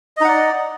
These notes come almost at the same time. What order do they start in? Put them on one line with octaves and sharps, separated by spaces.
D#5 D#4 F#5 D5